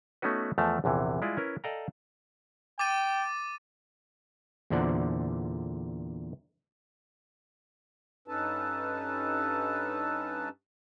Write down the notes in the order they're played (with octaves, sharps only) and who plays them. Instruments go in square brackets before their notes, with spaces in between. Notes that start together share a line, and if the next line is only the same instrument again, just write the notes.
[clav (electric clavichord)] A3 B3 C#4 D#4 F#4 B4
E2 F3 A3 G5 A5 A#5
A#1 E2 C3 E3
G3 G#3 E4 F4 D5 D#5
C#4 E4 A#4 B4
A4 D5 D#5 F5 G5 A#5
[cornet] G5 [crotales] D6 A6 D#7
[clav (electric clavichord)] E2 A#2 D3 C5 D5 F#5
[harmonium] G2 C#4 D#4 A4 B4 A5